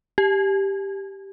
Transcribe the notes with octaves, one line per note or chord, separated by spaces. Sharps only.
G4